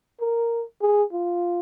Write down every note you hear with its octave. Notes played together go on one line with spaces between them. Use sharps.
A#4
G#4
F4